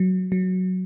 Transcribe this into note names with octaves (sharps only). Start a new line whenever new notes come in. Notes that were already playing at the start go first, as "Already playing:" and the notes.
Already playing: F#3
F#3